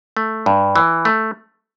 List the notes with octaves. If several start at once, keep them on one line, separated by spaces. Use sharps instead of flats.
A3
G2
E3
A3